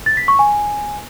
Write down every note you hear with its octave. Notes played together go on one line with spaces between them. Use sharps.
A6
B6
C#6
G#5